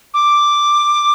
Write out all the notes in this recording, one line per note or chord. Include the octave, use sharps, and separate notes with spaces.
D6